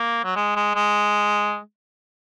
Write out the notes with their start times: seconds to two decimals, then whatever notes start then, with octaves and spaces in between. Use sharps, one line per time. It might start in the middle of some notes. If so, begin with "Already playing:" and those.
Already playing: A#3
0.24 F#3
0.36 G#3
0.56 G#3
0.75 G#3